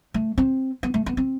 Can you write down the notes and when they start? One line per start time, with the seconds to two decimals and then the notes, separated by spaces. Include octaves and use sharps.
0.14 A3
0.38 C4
0.83 B3
0.94 A3
1.06 B3
1.17 C4